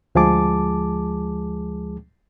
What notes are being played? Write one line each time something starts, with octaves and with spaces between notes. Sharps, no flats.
D2 F3 G#3 G#4 A5 D6